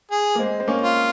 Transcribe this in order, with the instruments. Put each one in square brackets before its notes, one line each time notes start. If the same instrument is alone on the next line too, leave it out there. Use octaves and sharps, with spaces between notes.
[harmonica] G#4
[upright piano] A#3
G#3 C4
C4
A#3 C#4
[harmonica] F4